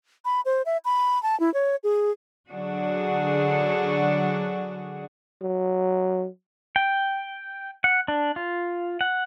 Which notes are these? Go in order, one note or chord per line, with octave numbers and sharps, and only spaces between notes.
B5
C5
E5
B5
A5
E4
C#5
G#4
D3 F#3 D4 F#4 G#4
F#3
G5
F#5
D4
F4
F#5